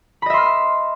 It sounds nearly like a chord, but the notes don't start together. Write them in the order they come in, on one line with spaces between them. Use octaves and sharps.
B5 D#5 E5 C6 F6